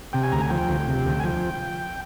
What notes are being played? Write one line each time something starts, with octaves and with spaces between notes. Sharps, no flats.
C3 G5
G#5
D2 A#5
G#5
F3 G5
D2
C3
D2
G#5
F3 G5